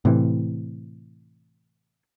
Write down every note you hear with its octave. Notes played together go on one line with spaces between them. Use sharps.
A2 C3 E3